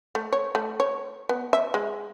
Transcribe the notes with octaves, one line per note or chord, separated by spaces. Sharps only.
A3
C#5
A3
C#5
B3
E5
G#3